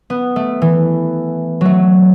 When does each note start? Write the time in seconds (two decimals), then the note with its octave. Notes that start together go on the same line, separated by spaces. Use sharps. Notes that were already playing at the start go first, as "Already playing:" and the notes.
0.10 B3
0.36 A3
0.62 E3
1.61 F#3 A3